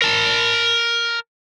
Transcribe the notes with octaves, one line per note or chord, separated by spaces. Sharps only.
A#4 A5